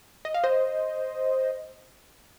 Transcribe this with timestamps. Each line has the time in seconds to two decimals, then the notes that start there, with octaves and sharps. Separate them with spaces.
0.25 D#5
0.34 F5
0.44 C5 D#5